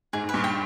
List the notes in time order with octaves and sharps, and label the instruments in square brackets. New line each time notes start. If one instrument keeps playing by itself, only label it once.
[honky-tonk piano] G#2 [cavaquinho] G#4
[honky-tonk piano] G#2
[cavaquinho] B4
[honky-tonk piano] G2 A#2
[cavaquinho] G5